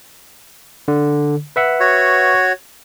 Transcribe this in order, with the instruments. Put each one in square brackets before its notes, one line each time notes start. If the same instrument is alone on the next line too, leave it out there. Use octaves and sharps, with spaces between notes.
[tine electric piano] D3
B4 E5 F#5
[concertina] F#4 C#5